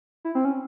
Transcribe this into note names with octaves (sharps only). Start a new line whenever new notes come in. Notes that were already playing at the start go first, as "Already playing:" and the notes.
E4
C4
C#4